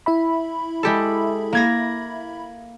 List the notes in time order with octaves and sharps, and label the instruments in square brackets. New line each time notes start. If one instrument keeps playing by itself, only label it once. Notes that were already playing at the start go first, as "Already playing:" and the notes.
[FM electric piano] E4 E5 B5
[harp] G#3 G4 A4
A#3 G#6 A#6